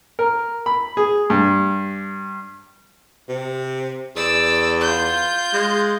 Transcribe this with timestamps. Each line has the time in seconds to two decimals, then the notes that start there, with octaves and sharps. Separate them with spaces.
0.19 A#4
0.66 B5
0.97 G#4
1.30 G2
3.29 C3
4.16 E2 D5 E6
4.81 F4 G6
5.54 G#3